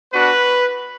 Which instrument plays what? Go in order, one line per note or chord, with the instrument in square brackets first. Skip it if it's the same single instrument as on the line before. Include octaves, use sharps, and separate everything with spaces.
[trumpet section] B3 D4 F#4 B4